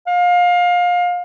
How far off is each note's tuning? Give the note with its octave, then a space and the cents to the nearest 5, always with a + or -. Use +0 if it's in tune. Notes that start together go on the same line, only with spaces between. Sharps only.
F5 +25